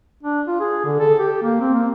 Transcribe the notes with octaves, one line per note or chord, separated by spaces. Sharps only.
D4
F4
G#4
D3
A4
G4
A#3
C4
A#3